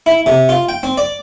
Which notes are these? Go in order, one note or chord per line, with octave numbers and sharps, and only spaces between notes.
E4
C3
F4
G5
C4
D5